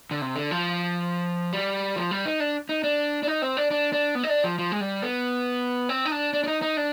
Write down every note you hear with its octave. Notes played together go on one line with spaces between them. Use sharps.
D3
C3
D3
F3
G3
F3
G3
D#4
D4
D#4
D4
D4
D#4
C4
D4
D4
D4
B3
D#4
D4
F3
F3
G#3
G3
B3
C4
D#4
D4
D4
D4
D#4
D#4
D4